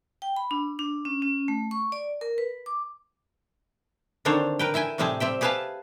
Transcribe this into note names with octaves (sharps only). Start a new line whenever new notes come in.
G5
B5
D4
D4
C#4
C#4
A3
C#6
D5
A#4
B4
D6
D3 D#3 C4 D4 C5 C#5
A#4 B4 G5
E4 E5 G5 G#5
A2 C3 G3 C4 G#4 A5
G3 C4 E5 G5
G4 G#4 B4 E5 F5 A5